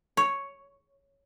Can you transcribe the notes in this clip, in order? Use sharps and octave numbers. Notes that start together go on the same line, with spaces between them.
C#5